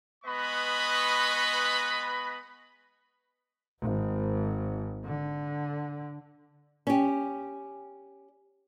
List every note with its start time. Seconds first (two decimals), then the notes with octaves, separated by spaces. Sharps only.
0.25 G#3 B3 B4 D#5 B5 C#6
3.80 G#1
5.05 D3
6.87 C#4 G4